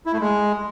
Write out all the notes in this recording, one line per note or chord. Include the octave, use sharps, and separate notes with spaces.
E4
A3
G#3